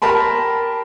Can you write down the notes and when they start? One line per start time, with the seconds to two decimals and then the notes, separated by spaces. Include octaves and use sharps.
0.02 G4 A#4 A5 B5 C6